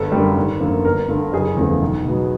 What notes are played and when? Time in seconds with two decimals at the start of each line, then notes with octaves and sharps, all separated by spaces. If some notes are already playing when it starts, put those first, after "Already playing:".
Already playing: G1 A4
0.12 F#2 D3 G3
0.36 G#1
0.60 F#2 D3 F3 A#3
0.85 G1 A#4
1.08 G2 D3
1.32 F#1 G#4
1.57 E2 C#3 F3 A3
1.82 B1
2.05 B2 F#3 B3